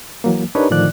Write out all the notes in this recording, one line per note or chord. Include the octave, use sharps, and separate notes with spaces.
E3 F#3 A#3
D4 D#4 G4 A#4 B4 C#5
A2 D3 D#3 F3 D5 F#6